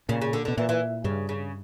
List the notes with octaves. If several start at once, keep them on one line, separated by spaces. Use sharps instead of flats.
A#2 C#3
C#3
D3
B2 D3
A#2 E3
E3
G2 C#3
C#3